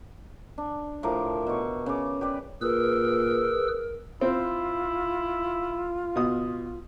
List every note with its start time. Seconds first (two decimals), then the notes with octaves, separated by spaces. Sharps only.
0.58 D4
1.03 A2 F3 A#4 D6
1.47 B2 C#6
1.86 C#3 D6
2.21 G4 B4 D5
2.61 A#2 G#4 A#4 B4 E6
4.21 C4 E4 F4
6.16 B2 D#6